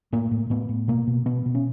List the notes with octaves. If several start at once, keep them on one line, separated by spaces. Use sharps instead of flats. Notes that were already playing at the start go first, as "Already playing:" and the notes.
A2 A#3
A2
A2 B3
A2
B2 A#3
B2
B2 B3
B2
C#4